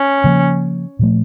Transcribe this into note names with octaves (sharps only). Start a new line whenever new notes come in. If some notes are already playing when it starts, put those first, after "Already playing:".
Already playing: C#4
C#3 F3 A#3
A#2 F3 A3